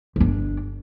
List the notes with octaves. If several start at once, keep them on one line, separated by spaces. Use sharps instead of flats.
G1 D4